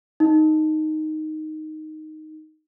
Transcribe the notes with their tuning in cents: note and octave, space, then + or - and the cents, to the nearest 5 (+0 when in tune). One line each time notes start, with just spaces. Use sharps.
D#4 +0